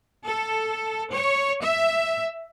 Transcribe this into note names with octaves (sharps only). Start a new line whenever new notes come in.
A4
C#5
E5